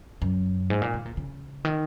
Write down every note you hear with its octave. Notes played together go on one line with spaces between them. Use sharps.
F#2
G#2
A#2
D#3
A#2
C#3
D#3